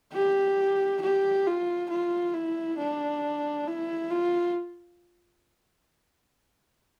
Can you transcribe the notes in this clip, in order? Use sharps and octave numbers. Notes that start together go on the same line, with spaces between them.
G4
G4
F4
F4
E4
D4
E4
F4